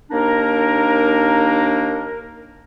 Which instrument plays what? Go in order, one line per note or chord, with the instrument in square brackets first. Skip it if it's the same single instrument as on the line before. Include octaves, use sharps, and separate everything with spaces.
[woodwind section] D#2 A#3 D4 D#4 A#4